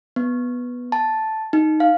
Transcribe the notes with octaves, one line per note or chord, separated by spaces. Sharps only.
B3
A5
D#4
F5